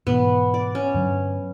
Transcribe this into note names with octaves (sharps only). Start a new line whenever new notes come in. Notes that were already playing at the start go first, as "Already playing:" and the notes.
G#2 B2 E3 B3
D5
C#4
G2 D3 F#3